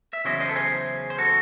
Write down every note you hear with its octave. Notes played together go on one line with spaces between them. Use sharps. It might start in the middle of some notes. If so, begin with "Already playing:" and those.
E5
E2 C#3 F#3 C#4 E4 C5 D#5
C5 D#5
A4
G#4 C5
C5
F#4 A4